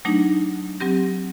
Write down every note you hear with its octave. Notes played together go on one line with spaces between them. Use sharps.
F#3 A3 D4 D#4
F#3 C4 G4 A#6